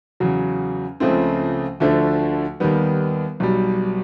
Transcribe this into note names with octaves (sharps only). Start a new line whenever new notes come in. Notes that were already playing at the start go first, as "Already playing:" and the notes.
E2 C#3 F#3
C#2 C#3 F3 A3 C4
D2 D3 F3 A3 D4
D#2 D#3 G3 B3
B1 B2 G3